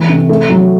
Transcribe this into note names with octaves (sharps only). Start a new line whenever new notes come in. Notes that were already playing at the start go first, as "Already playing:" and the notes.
Already playing: E3 A3
C3
A3
F#3